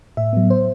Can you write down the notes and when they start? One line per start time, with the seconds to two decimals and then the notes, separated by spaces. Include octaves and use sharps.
0.17 A2 E5
0.33 F#3 B3
0.50 C5